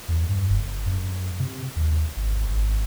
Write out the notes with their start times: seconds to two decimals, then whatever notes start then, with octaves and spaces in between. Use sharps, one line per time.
0.08 E2
0.29 G2
0.49 F#1
0.86 F#2
1.40 C3
1.76 D#2
2.17 G#1
2.48 G#1